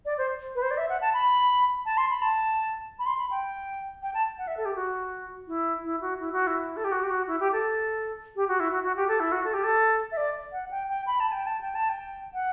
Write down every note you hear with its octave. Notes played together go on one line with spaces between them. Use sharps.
D5
C5
B4
C5
D5
E5
F#5
A5
B5
A5
C6
B5
A5
B5
C6
B5
G5
G5
A5
F#5
E5
A4
G4
F#4
E4
E4
F#4
E4
F#4
E4
A4
G4
F#4
G4
F#4
E4
G4
A4
G4
F#4
E4
F#4
F#4
G4
A4
E4
F#4
A4
G4
A4
E5
D5
F#5
G5
G5
B5
A5
G5
A5
G5
A5
G5
F#5